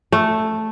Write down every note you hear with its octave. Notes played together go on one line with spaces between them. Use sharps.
A3